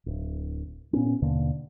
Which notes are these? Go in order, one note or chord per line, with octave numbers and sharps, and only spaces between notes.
D1
A#2 B3 C#4
D#2 B2 D3 A#3